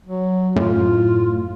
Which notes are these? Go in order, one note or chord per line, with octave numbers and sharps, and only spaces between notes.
F#3
F#2 A2 F4